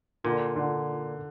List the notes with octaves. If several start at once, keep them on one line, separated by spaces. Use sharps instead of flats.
A#2 D3
D3